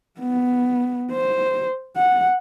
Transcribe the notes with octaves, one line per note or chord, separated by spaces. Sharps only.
B3
C5
F#5